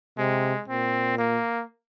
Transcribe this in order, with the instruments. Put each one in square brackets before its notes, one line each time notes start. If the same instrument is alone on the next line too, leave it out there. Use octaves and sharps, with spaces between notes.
[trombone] C3 [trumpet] G#3
[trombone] A#2 [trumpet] C4
[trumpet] A#3